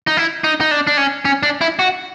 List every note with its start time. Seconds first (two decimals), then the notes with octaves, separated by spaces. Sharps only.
0.07 D#4
0.17 E4
0.44 D#4
0.61 D#4
0.71 D4
0.87 D4
0.97 C#4
1.25 C#4
1.43 D4
1.61 E4
1.79 F#4